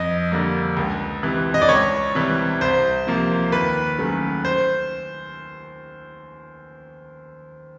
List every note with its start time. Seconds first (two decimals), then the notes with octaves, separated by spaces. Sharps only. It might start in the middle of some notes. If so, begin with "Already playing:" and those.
Already playing: F2 D#5
0.32 D3 G3 A#3
0.77 C#2
1.23 C3 E3
1.54 D#5
1.62 D5
1.69 C#2 C#5
2.15 C3 E3 G3
2.61 C2 C5
3.07 C3 F3 A#3
3.52 D#2 B4
3.99 C#3 F#3 A3
4.45 C5